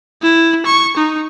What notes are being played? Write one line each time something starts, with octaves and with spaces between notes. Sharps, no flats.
E4
C#6
D#4